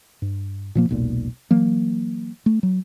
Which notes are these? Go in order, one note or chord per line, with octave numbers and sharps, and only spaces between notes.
G2
A#2 F3 A#3
E1 B1 A#2
E3 F#3 A#3
A3
F#3